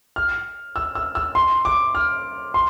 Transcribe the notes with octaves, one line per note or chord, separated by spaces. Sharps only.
F6
E6
E6
E6
C6
D6
F6
C6